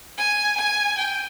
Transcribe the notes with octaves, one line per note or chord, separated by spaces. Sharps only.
G#5
G#5
G5